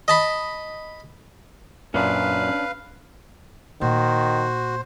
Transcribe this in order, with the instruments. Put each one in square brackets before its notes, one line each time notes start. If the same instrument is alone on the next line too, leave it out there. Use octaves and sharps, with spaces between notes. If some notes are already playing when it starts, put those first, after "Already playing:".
[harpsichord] D#5 A5 B5
[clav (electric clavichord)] F#2 A#2 [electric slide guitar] C#4 D4 [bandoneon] B4 F5
[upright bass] A#2 [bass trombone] D#3 [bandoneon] F#4 [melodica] C5